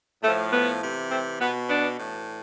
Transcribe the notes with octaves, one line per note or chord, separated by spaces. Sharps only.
A2 F3 A3
B3
C3 E3
A3 C4
B2 B3
B3 D4
A2 E3